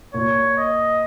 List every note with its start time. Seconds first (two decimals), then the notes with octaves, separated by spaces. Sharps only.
0.14 A#2 C#5
0.57 D#5